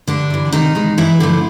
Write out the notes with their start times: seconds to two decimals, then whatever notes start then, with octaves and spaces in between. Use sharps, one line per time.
0.08 G2 D3 D4
0.30 E3 G3
0.52 C3 D#3 D#4
0.75 E3 G#3
0.97 G2 E3 E4
1.20 D3 F3 A3